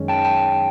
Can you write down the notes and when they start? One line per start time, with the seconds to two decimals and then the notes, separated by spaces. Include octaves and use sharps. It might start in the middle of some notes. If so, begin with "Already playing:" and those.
Already playing: F#2 D#3 G#3 C#4
0.08 G5 A5
0.24 G5 A5